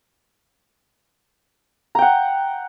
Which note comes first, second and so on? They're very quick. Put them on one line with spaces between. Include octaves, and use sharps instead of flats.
A#5 G5 F#5